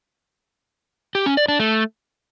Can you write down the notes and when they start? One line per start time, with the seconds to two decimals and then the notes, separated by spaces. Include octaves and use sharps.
1.15 G4
1.26 C#4
1.37 D5
1.48 D4
1.60 A3